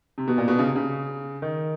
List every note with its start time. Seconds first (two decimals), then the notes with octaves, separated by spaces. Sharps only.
0.18 C3
0.27 B2
0.38 A#2
0.48 B2
0.59 C#3
0.68 C3
0.76 C#3
1.42 D#3